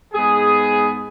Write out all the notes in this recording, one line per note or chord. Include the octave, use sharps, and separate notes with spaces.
G#2 G#3 B3 G#4